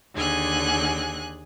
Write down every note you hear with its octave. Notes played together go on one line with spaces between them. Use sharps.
D#2 D3 G#4 G#5 F#6